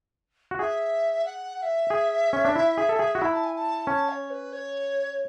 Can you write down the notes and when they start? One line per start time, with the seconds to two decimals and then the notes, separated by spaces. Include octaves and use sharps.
0.51 F#4
0.59 G#4 E5
1.25 F#5
1.57 F#5
1.62 E5
1.90 G#4
2.33 C#4
2.45 D4
2.56 E4
2.78 G#4
2.89 A4
2.99 G#4
3.15 F#4
3.22 E4 B5
3.33 A5
3.44 G#5
3.55 A5
3.87 C#4 A5
4.09 C#5
4.30 B4
4.53 C#5